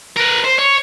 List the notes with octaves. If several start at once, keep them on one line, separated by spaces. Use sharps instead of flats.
A#4 B4
C5
C#5